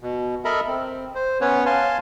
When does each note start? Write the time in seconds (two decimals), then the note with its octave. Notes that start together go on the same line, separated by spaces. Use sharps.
0.01 B2
0.45 A4 A#4 D#5 E5 A#5 B5
0.68 C4
1.15 C5
1.41 B3 C#4 B4 C#5
1.66 F5 G#5 A5 C6